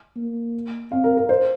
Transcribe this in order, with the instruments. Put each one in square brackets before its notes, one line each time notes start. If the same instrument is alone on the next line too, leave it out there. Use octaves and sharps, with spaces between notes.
[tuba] A#3
[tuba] C4 [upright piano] F5
[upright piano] A#4
A#4
C5